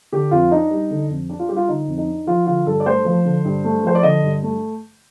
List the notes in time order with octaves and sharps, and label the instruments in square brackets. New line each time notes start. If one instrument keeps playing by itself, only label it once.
[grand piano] D3 G4
F2 F4
D4 D#4
G3
D3
F2
D4
F4
G3 G4
F4
D3 D#4
F2
D#4
D4
F3 F4
D3 F4
G2 A4
D5
A3 C5
F3
D3
G2
A3
F3 C5
D5
D3 D#5
G2
A3